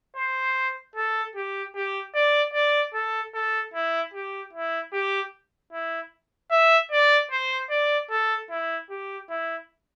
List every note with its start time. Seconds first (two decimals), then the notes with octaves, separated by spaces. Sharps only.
0.16 C5
0.95 A4
1.36 G4
1.75 G4
2.15 D5
2.54 D5
2.94 A4
3.34 A4
3.74 E4
4.14 G4
4.53 E4
4.93 G4
5.73 E4
6.51 E5
6.91 D5
7.31 C5
7.70 D5
8.10 A4
8.50 E4
8.90 G4
9.30 E4